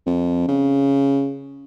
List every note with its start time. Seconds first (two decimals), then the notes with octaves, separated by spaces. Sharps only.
0.06 F2
0.48 C#3